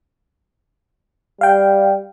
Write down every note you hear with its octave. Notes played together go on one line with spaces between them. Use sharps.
G3 F5 G5